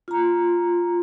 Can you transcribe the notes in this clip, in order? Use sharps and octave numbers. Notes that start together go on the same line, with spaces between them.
F4 A#5